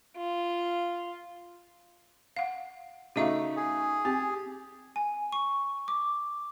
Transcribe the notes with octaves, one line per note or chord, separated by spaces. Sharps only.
F4
F5 F#5
C#3 A3 D#4 F#4 E5 F5
G#4
C4 G4
G#5
C#6
D6